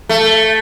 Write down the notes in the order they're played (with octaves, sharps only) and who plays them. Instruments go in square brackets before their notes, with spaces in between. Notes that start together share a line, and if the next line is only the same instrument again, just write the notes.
[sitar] A3